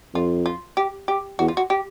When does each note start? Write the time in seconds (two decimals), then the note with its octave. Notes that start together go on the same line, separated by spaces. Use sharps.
0.14 F2 F4
0.46 F4
0.77 G4
1.08 G4
1.39 E2 F#4
1.48 F4
1.57 F#4
1.70 G4